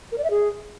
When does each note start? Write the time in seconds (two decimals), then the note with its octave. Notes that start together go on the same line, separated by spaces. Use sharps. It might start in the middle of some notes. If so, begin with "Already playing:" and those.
0.12 A#4
0.18 D5
0.24 E5
0.30 G#4